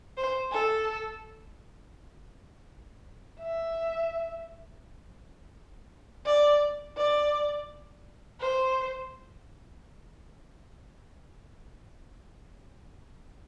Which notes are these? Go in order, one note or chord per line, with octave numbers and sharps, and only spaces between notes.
C5
A4
E5
D5
D5
C5